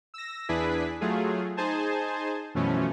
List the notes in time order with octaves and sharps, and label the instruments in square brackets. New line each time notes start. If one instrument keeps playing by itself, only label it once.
[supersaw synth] E6 A#6
E2 D4 E4 G#4 B4 B6
F#3 A3 F4 G#4
D#4 G#4 C5 G#5 A5
F#2 B2 E3 F3 A3 C#4